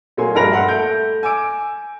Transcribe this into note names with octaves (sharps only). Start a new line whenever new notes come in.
A#2 F#3 A#3 G#5 C6
A#1 G2 A#4 B5 A#6 F7
E5 F#5 C6
A3 A4 G6 D7
G#5 D6 E6 D7